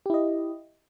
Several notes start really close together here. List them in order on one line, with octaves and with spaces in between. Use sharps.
G4 E4 D#5